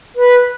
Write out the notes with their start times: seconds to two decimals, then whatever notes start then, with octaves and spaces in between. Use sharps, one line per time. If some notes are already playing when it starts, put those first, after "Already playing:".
0.16 B4